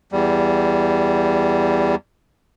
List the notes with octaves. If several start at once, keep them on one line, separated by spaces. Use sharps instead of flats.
E2 G3